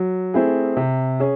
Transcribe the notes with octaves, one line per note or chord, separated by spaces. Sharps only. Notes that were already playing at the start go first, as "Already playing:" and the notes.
Already playing: F#3
A3 C4 E4 G#4
C3
C#4 G#4